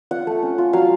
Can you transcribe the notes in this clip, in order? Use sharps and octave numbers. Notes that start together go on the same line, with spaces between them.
F4 F#5
A3
C#4
F4
F#3 F5